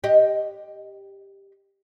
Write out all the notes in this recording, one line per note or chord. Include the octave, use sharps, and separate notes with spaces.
G4 D#5